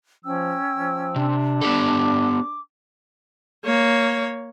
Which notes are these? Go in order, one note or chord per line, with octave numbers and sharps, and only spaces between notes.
F3 C#4 G5 E6
F3
C3 D4
B3 G4 A4 D6
A#3 C#5